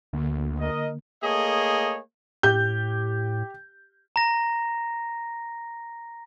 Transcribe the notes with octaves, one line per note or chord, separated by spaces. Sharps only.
D2 D3 A#3
A#4 D#5
A3 A#3 G#4 C#5 D#5
A2 G4 G6
A#5 A#6